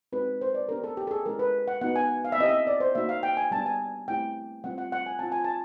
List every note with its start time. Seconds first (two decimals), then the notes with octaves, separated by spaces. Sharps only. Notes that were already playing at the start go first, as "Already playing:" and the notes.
0.13 G#3 C4 D#4 F#4 B4
0.41 C5
0.54 D5
0.69 B3 D4 G4 A#4
0.84 A4
0.97 G4
1.07 A4
1.11 G#4
1.26 G#3 C#4 E4 G4 A#4
1.39 B4
1.68 F#5
1.81 B3 D#4 F#4 F#5
1.96 G#5
2.25 F5
2.32 E5
2.38 C4 E4 G4 D#5
2.49 E5
2.67 D5
2.80 C5
2.95 A#3 D#4 F#4 E5
3.09 F5
3.23 G5
3.37 G#5
3.51 G3 B3 D4 A5
3.66 G#5
4.08 A3 C4 E4 G4 G5
4.64 G3 C4 F4 F#5
4.78 F#5
4.92 F#5
5.06 G#5
5.19 C4 F4 A5
5.32 G#5
5.44 A5